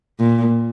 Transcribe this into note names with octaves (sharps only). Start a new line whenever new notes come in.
A#2